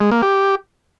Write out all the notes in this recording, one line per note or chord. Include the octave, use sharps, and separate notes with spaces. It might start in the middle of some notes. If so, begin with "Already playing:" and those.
G#3
A#3
G4